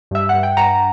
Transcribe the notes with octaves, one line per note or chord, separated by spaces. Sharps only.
G2 E5
G2 F#5
G5
G2 F#5 A#5